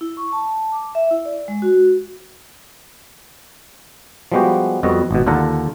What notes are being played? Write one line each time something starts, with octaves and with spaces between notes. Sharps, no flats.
E4
C#6
A5
D6
E5
E4
D5
G#3
F#4
F3 G3 G#3 B3 F#4 G4
F2 G3 B3 F#4 D#5
G#1 B2
D#2 D3 F4 A4 F#5 A#5